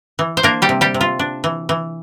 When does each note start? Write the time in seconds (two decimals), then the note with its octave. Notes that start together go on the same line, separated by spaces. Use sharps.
0.19 E3
0.37 C5
0.43 A#3 D4 A#4
0.62 G3 G4
0.69 C3
0.81 G3 G4
0.94 C3
1.01 F4
1.19 D4
1.44 E3
1.69 E3